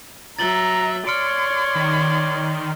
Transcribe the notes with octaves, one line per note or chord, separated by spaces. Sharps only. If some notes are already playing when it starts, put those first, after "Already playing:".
F#3 E5 A#5 A6 F#7 G7
C#5 D5 C6 F6 C#7 D7
D#3